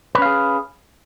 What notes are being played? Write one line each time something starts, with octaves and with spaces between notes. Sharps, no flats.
C#4 G#4 B4 F5